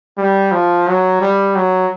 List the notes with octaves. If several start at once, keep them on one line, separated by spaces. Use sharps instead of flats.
G3
F3
F#3
G3
F#3